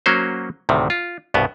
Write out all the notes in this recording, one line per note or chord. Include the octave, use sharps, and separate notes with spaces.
F#3 A#3 C#4 F#4 C5
D2 A2 C3 D#3
F4
C2 G2 B2 B3